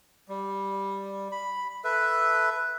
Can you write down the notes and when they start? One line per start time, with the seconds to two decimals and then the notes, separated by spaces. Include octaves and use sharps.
0.28 G3
1.32 B5
1.84 A4 B4 E5